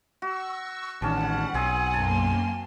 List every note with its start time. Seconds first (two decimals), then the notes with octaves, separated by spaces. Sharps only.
0.22 F#4 C#6 E6
1.02 A1 D#3 G3 C#4 F#5 A5
1.54 B1 C4 G#4 G#5
1.94 F#2 A#3 A5 C6